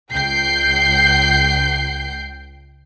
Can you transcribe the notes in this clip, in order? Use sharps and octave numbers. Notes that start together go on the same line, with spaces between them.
C#2 G5 G6 C7